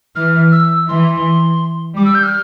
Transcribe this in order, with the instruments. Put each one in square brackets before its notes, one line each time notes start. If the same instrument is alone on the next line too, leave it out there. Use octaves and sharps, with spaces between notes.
[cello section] E3 [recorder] F6
[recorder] E6
[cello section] E3 [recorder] C6
[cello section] G3 [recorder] D6
[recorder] E6
G6
F6